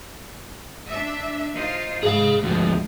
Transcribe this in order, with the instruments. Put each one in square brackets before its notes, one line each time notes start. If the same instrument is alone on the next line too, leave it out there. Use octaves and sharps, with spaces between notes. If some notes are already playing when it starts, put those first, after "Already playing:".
[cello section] D4 E5
D#4 F4 C5
[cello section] G#2 [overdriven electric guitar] G#4 F5
[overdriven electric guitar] D2 F3 [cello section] G#3